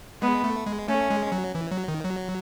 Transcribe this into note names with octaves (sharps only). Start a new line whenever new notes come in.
G#3 B3
A3
G#3
A3 C#4
G#3
F#3
E3
F#3
D#3
F#3